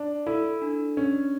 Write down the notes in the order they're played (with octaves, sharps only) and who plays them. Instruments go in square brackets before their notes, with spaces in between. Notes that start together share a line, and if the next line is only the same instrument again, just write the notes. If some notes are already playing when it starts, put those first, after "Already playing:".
Already playing: [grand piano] D4
[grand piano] E4 [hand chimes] A4
[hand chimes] D4
[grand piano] C#4 [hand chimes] D4